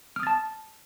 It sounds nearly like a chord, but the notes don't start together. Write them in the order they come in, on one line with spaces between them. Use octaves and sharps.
F6 D#6 A6 A5